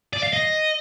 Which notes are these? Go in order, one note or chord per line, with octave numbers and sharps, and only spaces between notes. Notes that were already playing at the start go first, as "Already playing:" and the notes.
D5
F5
D#5